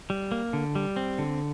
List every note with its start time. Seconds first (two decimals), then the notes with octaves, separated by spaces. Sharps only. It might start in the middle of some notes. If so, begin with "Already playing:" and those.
0.10 G3
0.32 A#3
0.53 D3
0.75 G3
0.96 C4
1.18 D3